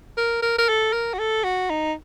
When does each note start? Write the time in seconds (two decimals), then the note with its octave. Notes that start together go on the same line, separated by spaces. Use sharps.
0.17 A#4
0.42 A#4
0.58 A#4
0.69 A4
0.93 A#4
1.14 F#4
1.19 A4
1.44 F#4
1.70 D#4